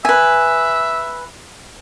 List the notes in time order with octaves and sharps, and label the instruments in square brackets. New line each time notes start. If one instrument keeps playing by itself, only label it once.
[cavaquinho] B4 G#5 [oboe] E5